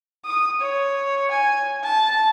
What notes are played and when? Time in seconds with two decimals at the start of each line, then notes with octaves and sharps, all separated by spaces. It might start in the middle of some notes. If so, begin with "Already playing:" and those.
0.25 D#6
0.61 C#5
1.31 G#5
1.83 A5